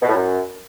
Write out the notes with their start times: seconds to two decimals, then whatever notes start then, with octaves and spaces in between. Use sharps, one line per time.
0.02 B2
0.08 A2
0.14 F#2